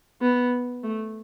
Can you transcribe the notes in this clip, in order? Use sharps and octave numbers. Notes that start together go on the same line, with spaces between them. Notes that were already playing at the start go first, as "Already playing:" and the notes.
B3
A3